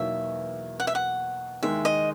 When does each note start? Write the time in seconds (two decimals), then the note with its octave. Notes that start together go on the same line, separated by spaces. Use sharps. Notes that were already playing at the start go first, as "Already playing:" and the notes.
Already playing: E2 B2 F#3 A#3 D#4 E5
0.80 F#5
0.87 E5
0.95 F#5
1.63 D#2 D#3 G#3 E5
1.85 D#5